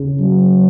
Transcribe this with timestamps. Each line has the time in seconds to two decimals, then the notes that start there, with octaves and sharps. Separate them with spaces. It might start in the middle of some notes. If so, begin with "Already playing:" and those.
Already playing: C#3
0.20 F#3